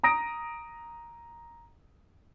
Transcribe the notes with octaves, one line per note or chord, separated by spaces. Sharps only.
A#5 D#6 A#6 D7